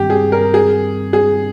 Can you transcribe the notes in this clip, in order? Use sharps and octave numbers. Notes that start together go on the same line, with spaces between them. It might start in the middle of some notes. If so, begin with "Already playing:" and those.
Already playing: G2 D#3 G3 C4 G4
G#4
A#4
G#4
G#4